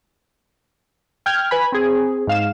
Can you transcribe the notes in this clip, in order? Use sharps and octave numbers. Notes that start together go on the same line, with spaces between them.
G5 F6 G6 G#6
B4 G#5 B5
C4 G#4
G#2 F5 E7